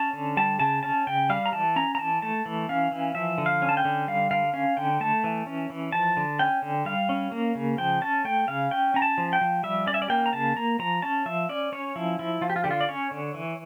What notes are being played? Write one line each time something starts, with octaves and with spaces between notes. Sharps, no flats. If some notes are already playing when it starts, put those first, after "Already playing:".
Already playing: C#4 A5
D3
G3 A5
C#3 A5
C#4 A5
C#3 G5
G3 F5
A#5
E3 A5
C#4 A#5
A#5
E3 A5
A3 A5
E3
C#4 F5
E3
F3 E5
D3
F5
C#4
A5
G5
D3
G3 F5
D3 F5
C#4 F5
D3 G5
A3 A5
E3
C#4
E3
F3 A5
D3
C#4 G5
D3
G3 F5
C#4
A#3
C#3
F3 G5
C#4 A5
A3 G5
C#3 F5
C#4 G5
C#4 A#5
A5
F3
G5
F3
G3 E5
C#4 D5
E5
D5
A#3 G5
A#5
C#3 A5
A#3 A#5
F3 A#5
C#4 A5
F3 E5
C#4 D5
C#4 C#5
F3 E4
F3 E4
F3 F4
G4
F4
D3 G4
F4
D5
C#4 C#5
D3
E3